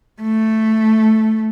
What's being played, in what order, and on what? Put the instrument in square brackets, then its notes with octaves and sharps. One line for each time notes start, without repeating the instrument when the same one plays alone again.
[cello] A3